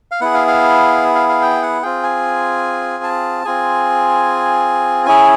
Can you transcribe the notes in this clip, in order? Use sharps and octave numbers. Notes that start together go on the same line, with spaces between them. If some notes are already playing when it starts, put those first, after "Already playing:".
F5
B3 E4 G#4 F#5
F5
F5
F5
F5
G5
F#5
C4 F4 G#4 G5
G#5
A5
C4 F4 G#4 G#5
C#4 E4 G#4 G#5